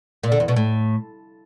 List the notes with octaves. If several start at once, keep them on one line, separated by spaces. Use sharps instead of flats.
A#2
D3
E2
B2
A2